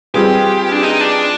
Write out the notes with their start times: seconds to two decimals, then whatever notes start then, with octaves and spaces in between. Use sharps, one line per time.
0.14 G3 C4 F4 G4 G#4 B4
0.72 D4
0.83 D#4
1.01 D4